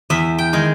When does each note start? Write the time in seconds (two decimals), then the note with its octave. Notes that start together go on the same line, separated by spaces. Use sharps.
0.10 E2 E5
0.38 G5
0.53 D#3 G#3